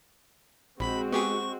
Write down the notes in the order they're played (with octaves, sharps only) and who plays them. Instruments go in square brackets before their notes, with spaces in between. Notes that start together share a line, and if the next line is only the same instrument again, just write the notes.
[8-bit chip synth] A#1 [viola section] G#3 C4 F#4 [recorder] B5
[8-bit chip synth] B3 G4 G#4 [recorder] C#6